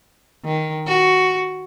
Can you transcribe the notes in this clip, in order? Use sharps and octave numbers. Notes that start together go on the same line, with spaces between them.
D#3
F#4